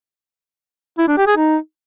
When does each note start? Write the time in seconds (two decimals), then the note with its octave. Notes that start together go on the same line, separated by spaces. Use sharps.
0.98 E4
1.08 D4
1.18 G4
1.27 G#4
1.37 D#4